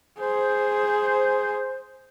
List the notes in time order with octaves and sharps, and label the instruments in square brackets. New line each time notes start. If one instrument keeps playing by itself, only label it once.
[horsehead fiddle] G#4 [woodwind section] C5